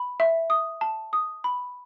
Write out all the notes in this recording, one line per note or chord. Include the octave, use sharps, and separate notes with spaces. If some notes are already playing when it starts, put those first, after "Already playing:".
Already playing: B5
E5
D#6
A5
D#6
B5